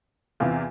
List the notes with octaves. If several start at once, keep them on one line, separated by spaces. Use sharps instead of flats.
E2 C3 E3 F4